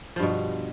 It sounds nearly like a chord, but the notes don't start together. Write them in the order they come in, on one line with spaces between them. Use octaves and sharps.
F3 G2 B2